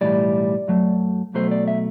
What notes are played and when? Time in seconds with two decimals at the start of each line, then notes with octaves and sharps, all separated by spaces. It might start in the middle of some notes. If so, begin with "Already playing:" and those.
0.01 B1 A2 E3 G3 D5
0.68 F#2 F#3 A3
1.34 B1 B2 F#3 A3 C5
1.51 D5
1.68 E5